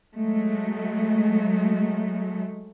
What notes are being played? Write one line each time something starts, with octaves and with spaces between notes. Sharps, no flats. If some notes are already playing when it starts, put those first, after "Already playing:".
F#3 G#3 A3